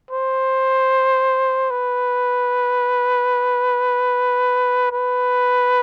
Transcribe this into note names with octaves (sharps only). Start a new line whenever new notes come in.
C5
B4
B4